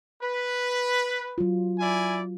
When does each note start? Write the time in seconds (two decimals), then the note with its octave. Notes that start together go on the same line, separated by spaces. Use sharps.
0.23 B4
1.38 F#3 F4
1.80 E4 D5 G#5